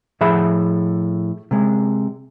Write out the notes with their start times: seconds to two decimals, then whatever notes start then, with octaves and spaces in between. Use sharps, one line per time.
0.21 A2 F3 G#4 E5 B5
1.51 C3 G#3